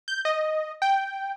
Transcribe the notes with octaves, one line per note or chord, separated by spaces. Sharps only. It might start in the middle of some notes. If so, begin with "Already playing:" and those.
G6
D#5
G5